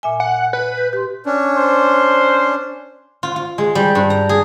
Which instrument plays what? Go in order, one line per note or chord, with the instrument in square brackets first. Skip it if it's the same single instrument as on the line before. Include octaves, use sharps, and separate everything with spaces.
[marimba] A#2 E5 G#5
[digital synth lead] F#5
B4
[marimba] G6
G4 C6
[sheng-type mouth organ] C#4 D4
[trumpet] C5
[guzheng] F4
F4
G#3
G3
G2
A#5
G#4